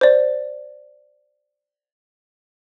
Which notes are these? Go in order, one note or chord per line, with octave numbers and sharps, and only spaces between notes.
C5 D5